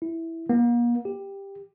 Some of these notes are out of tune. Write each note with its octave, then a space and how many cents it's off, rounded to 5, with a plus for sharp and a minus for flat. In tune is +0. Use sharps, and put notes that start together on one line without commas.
E4 -5
A#3 +40
G4 +10